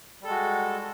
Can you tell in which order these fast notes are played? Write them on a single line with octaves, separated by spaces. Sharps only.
G3 A4 G#3 F#4